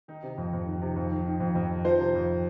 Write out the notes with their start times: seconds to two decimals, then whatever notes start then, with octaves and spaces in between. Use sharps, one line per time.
0.08 D#3 D#4
0.23 C3
0.38 F2
0.53 F2
0.67 D#3
0.81 C3
0.96 F2
1.11 D#3
1.27 D#3
1.40 F2
1.55 F2
1.70 D#3
1.85 F3 C5
1.99 C3
2.15 F2